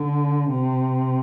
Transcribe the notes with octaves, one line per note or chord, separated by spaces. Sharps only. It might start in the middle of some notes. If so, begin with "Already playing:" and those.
Already playing: D3
C3